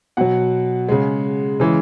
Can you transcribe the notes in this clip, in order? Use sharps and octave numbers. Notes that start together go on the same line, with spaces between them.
B2 F#3 F#5
C#3 G#3
C#3 E3 G#3